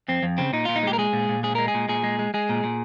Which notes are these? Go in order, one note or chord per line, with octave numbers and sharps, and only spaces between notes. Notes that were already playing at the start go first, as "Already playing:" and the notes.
F2 C4
F2
C#3 C4
A#2 D#4
A#2 F4
D#4
G#3 G4
A#4
G#3 G#4
A#2
A#2
G#3 G#4
G#3 A#4
G#4
A#2
A#2 G#4
G#3
G#3
G#3 G#4
A#2
A#2